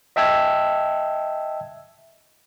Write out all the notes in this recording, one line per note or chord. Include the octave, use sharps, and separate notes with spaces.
D#5 E5 G5 A5 E6 G#6